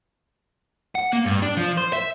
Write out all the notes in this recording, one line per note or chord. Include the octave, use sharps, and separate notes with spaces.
F#5
A#3
G2
D4
F3
C5
E5